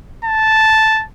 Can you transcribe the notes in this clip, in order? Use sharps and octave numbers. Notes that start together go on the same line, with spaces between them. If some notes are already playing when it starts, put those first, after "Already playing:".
A5